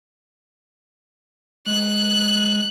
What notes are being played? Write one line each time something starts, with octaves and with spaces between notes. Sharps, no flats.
G#3 F#6